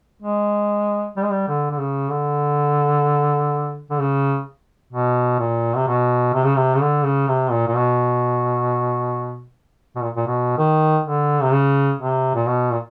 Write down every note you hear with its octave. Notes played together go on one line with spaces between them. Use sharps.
G#3
G3
G#3
G3
D3
D3
C#3
D3
D3
C#3
B2
A#2
C3
B2
C3
C#3
C3
C#3
D3
C#3
C3
A#2
A#2
B2
B2
A#2
A#2
B2
D#3
D3
C3
C#3
C3
A#2
B2
A#2